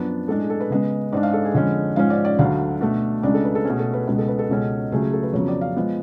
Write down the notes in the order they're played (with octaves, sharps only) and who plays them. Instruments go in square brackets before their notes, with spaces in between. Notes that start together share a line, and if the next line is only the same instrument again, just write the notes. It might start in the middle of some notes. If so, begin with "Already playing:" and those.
Already playing: [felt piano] F#2 F3 B3 D4
A2 G#3 D4 A4
G#4
A4
B4
C#3 G#3 B3
G#2 G#3 D4 D5
F5
A4
G#4
F2 D3 G#3 C#4
G#2 F3 G#3 C#4 F5
D5
D5
D2 D3 F#3 F5
B2 A3 D4
C#2 C#3 G#3 D4 D5
A4
B4
A4
B2 A3 C#4 G#4
A4
B4
C#2 B2 G#3 B4
A4
B4
A4
C#2 B2 G#3 C#4
C#2 C#3 F#3 A3 C#4 G#4
G#4
A4
B4
F2 C#3 F#3 B3 C#5
D5
F5
F3 G#3 B3